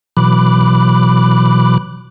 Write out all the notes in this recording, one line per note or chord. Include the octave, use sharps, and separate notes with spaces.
B2 E3 F#3 B5 D6 F#6